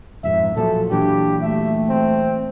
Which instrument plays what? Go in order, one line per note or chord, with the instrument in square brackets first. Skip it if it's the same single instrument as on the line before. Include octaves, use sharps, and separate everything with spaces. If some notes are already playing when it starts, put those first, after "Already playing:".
[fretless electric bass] D#1 F2 G#2 [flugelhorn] E5
[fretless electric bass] A#2 F3 F#3 [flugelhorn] A4
[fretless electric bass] A#2 E3 F#3 [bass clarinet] D4 [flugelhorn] G4
[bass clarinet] A3 [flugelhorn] E5
[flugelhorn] C4